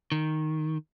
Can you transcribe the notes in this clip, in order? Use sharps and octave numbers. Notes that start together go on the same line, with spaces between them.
D#3